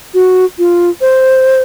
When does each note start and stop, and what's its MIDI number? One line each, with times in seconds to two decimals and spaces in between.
0.14 0.45 66
0.58 0.90 65
1.01 1.62 72